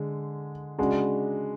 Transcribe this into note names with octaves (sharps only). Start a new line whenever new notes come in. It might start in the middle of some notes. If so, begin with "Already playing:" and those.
Already playing: D3 G#3
C#3 G#3 D4 F#4